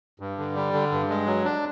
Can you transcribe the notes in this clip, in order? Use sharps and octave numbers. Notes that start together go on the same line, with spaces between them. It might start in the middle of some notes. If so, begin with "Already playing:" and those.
G2
D3
G3
D3
G2
G#3
F#3
D4